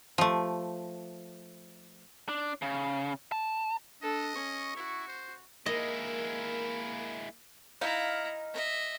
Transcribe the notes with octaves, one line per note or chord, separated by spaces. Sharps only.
F3 A3
D4
C#3
A5
D4 A4 D#5
C#4 C#6
E4 F#4
C5
G#3 A#3 E4 A#4 D#5
D#4 E4 F5 A#5
D#5 E5